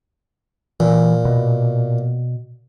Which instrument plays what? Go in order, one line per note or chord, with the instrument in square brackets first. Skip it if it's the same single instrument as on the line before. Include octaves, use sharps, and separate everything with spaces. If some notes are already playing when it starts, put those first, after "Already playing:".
[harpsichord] A#2 [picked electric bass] E3
[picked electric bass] B2